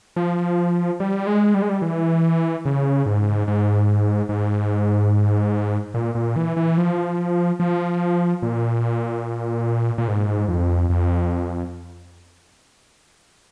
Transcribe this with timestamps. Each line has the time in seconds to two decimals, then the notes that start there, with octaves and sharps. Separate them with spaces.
0.16 F3
1.00 G3
1.27 G#3
1.54 G3
1.62 G#3
1.69 G3
1.82 E3
2.65 C#3
3.06 G#2
3.48 G#2
4.29 G#2
5.94 A#2
6.15 A#2
6.36 E3
6.56 E3
6.77 F3
7.60 F3
8.42 A#2
9.98 A#2
10.08 G#2
10.48 F2
10.90 F2